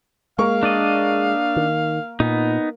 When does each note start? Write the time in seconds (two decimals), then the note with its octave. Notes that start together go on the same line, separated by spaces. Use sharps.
0.38 G#3 A#3 F5 C#6
0.63 D4 D5 D#5
1.56 D#3
2.20 A#2 B3 D#4